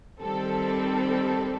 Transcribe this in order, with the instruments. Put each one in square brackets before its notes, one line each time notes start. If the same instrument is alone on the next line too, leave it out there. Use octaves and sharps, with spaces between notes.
[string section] D#3 G3 C4 A4